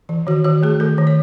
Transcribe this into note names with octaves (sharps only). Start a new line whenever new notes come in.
E3
D#3 F#4
D#3 F#4
A3 G#4
D#3 A4
D#3
C#5